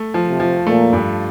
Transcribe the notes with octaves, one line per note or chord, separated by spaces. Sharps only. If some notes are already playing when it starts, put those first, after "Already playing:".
Already playing: A3
F3
C3
F3
A#2 A3
G2